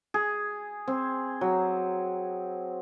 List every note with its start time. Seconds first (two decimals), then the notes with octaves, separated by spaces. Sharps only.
0.14 G#4
0.88 C4
1.41 F#3